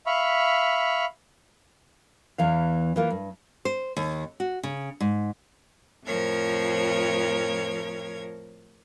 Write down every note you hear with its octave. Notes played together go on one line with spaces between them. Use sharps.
E5 F5 B5 C#6
E2 E3 F5
E3 A#3 F4
G2
C5
D#2
F#4
C#3
G#2
F2 A2 F3 A#4 C#5 G#6